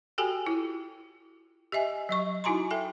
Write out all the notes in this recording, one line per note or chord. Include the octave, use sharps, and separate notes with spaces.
F#4 G4 A4 G5 G#5
E4 F4
G4 D#5 E5 G#5
F#3 D#5 C#6
D#4 E4 F#4 G#5 A#5 C6
A4 E5 G5